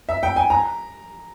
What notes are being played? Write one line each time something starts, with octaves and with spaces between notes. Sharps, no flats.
E5
G5
G#5
A#5